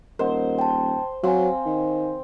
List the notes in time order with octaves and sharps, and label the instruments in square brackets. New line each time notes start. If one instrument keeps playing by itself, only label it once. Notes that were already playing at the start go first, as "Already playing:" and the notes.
[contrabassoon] D#1 [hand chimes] A#4 D#5 F#5 [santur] C5
[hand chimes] G5 A5
[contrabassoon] F#3 [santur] C4 [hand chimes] F5 G#5
[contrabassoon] D#3